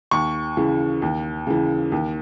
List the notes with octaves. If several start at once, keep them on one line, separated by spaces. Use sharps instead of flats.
D#2 C#6
C#3 E3
D#2
C#3 E3
D#2